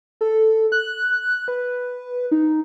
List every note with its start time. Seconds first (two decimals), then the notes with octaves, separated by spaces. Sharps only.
0.21 A4
0.72 F#6
1.48 B4
2.31 D#4